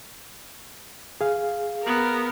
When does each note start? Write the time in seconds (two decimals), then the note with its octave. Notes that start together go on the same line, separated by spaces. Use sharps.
1.21 G#4 F5
1.83 B3 A#4